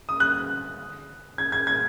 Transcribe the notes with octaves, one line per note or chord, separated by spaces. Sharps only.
D#6
F#6
G#6
G#6
G#6